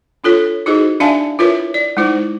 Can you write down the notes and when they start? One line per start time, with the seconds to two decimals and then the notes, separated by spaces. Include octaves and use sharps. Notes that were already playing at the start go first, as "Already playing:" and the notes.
0.24 D4 F4 A4 C#5
0.66 D#4 E4 F#4 G#4 C5 D#5
1.00 D4 D5 E5 F5 G#5 A5
1.39 E4 F4 A#4 B4 C#5 E5
1.74 D5
1.97 G#3 D#4 E4 C5